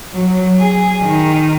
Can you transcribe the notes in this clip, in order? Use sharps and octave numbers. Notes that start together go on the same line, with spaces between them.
F#3
G#4
D#3